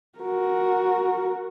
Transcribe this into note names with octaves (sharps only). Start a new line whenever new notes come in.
F#4 A#4